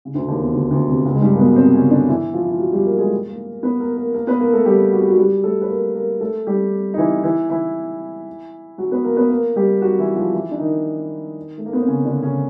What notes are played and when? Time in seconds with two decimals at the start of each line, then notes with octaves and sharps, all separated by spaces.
0.05 C#3
0.14 D2 D3
0.28 D#2 D#3
0.40 E2 E3
0.53 D2 D3
0.71 D2 D3
0.88 C3
1.05 C#2 C#3
1.14 G#3
1.22 G2 G3
1.33 A#3
1.39 B2 B3
1.56 C3 C4
1.74 C#3 C#4
1.90 D3 D4
2.08 E3 E4
2.34 F3 F4
2.43 E4
2.51 F4
2.59 F#3 F#4
2.72 G3 G4
2.85 A#3 A#4
2.98 G#3 G#4
3.29 A#3 A#4
3.63 B3 B4
3.80 A#3 A#4
3.97 A#3 A#4
4.14 A#3 A#4
4.27 B3 B4
4.40 A#3 A#4
4.53 A3 A4
4.65 G3 G4
4.92 F#4
5.00 G4
5.08 F#3 F#4
5.17 G3 G4
5.44 A3 A4
5.62 B4
5.69 A#3 A#4
5.94 A#3 A#4
6.21 A3 A4
6.47 G3 G4
6.94 D#4
6.98 E3 E4
7.24 E3 E4
7.50 E3 E4
8.78 F#3 F#4
8.91 B3 B4
9.04 A#3 A#4
9.17 B3 B4
9.30 A#3 A#4
9.56 G3 G4
9.81 F#3 F#4
9.99 E3 E4
10.16 F3 F4
10.33 E3 E4
10.51 D4
10.59 D#3 D#4
11.58 A3
11.66 A#3
11.73 B3
11.80 C4
11.88 C#3 C#4
12.05 D3 D4
12.22 C#3 C#4